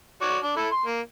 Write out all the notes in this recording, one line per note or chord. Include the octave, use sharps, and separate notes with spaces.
F#4 C#5 D5
D4
E4 A4
C6
A#3